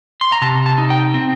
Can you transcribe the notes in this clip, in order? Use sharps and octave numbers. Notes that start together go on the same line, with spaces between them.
C6
A#5
C3 A5
A5
D#4
G5
C4